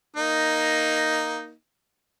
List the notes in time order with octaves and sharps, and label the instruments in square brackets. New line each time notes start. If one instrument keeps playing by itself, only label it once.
[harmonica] A#3 D#4